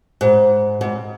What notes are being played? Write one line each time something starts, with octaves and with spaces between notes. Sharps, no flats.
G#2
G#2